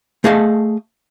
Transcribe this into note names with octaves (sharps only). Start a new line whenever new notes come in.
A3 G#4 D#5 F5 F#5 A5